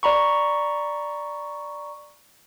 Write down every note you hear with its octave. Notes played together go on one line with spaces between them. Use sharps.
D5 A#5 B5 C#6